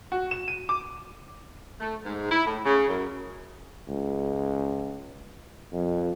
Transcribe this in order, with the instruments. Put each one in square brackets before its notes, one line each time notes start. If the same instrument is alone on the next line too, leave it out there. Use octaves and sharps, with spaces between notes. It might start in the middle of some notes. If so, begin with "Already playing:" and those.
[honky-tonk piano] F#4
E7
D#7
D6
[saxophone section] A3
G#2
E4
A2
C#3
F#2
[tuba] C#2
F2